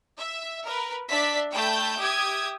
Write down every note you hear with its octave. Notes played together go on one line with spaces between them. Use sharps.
E5
A#4 B4
D4 D5 E5 B6
A3 G5 A5 B5 G6
G4 E5 G5 D#6 G#6